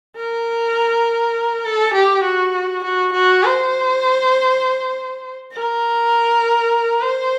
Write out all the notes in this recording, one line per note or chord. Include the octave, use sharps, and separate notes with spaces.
A#4
A4
G4
F#4
F#4
F#4
C5
A#4
C5